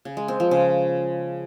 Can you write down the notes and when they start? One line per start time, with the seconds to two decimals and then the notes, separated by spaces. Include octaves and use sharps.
0.05 C#3
0.17 G#3
0.28 C4
0.40 F3
0.51 C#3